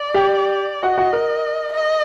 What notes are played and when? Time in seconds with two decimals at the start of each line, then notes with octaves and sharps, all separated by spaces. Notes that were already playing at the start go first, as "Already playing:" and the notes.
Already playing: D5
0.14 G4 G5
0.83 F#4 D#5 F#5
0.98 F#4 F#5
1.13 A#4
1.73 D#5